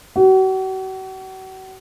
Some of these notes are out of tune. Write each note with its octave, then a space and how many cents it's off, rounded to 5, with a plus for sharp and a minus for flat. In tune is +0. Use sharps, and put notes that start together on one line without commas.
F#4 +40